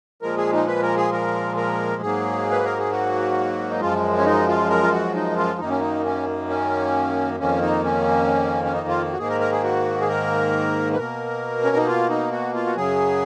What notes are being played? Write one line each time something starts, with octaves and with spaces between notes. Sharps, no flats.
A#2 F3 G#3 A#4
G#4
D#4
B4
A#4
G#4
A#4
A#4
G#2 F#3 A#3 G#4
B4
A#4
G#4
F#4
D#4
F#2 F3 G#3 F4
C#4
D#4
F4
A#4
F4
F#4
D#4
F4
F#2 D#3 A#3 D#4
C#4
D#4
C#4
C#4
F2 D#3 A#3 C#4
D#4
C#4
C#4
D#4
F4
F#4
G#2 D#3 A#3 G#4
A#4
A#4
G#4
F#4
G#4
A#4
B4
B2 A#3 A#4
C#4
D#4
F4
D#4
F#4
F4
F#4
F#2 C#3 F#3 G#4